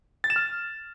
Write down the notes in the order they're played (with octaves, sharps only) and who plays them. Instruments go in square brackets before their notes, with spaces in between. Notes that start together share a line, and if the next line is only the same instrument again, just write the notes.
[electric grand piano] A6
E7
F6